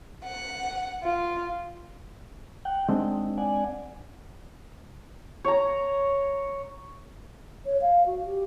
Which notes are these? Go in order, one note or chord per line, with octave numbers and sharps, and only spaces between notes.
F#5
F4
F#5 G5
G#3 C4 D4 D#4
D5 F#5 G#5
C#5 A#5
C#5
F5
F#4
G4